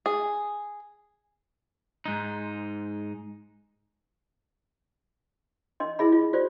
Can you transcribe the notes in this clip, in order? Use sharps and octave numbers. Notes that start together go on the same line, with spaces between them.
G#4
G#2 D#4
D4 D#5 C6
E4 G#4 D#5 B5
F4
F4 F#4 C5 D5